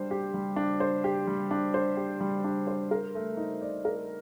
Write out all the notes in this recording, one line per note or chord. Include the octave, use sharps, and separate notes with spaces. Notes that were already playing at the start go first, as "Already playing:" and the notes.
Already playing: G3 D4 C5
G4
G3
D4
C5
G4
G3
D4
C5
G4
G3
D4
C5
A#4
A3
D#4
D5
A#4